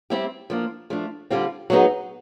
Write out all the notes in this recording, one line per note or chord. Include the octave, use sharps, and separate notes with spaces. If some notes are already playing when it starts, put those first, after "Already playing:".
G3 C4 E4 G4
F3 A#3 D4
F3 A3 D4
D3 G3 C4 F4
F#3 B3 D#4 G#4